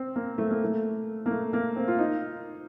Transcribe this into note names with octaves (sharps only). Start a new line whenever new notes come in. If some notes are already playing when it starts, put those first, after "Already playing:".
Already playing: C4
A#3
A3
A#3
A3
A#3
A3
A#3
C4
F4
D#4